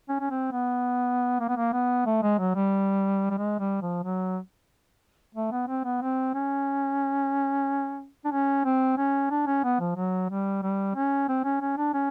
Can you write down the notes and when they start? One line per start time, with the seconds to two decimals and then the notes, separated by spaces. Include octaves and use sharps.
0.09 C#4
0.20 C#4
0.30 C4
0.52 B3
1.40 A#3
1.49 B3
1.57 A#3
1.73 B3
2.06 A3
2.23 G#3
2.39 F#3
2.55 G3
3.30 G3
3.38 G#3
3.60 G3
3.82 F3
4.04 F#3
5.35 A3
5.52 B3
5.68 C4
5.84 B3
6.02 C4
6.35 C#4
8.25 D4
8.31 C#4
8.65 C4
8.98 C#4
9.31 D4
9.46 C#4
9.64 B3
9.80 F3
9.96 F#3
10.30 G3
10.63 G3
10.95 C#4
11.29 C4
11.44 C#4
11.61 C#4
11.78 D4
11.94 C#4